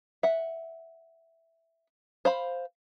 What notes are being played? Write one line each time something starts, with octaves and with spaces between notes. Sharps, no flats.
E5 F#5
C5 F5 B5